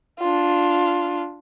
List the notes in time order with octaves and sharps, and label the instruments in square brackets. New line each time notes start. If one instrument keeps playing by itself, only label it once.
[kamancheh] D4 F4